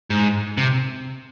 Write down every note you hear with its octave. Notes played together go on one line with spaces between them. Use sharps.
G#2
C3